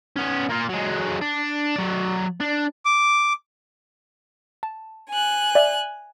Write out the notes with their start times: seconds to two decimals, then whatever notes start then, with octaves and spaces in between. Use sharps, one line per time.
0.16 B3 C#4
0.50 A#3 F4
0.69 F#3 G#3
1.21 D4
1.76 F#3 D5
2.40 D4
2.85 D6
4.63 A5
5.09 G#5 F#6
5.55 D5 E5